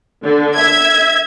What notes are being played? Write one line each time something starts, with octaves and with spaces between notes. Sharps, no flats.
D3
E5 G#6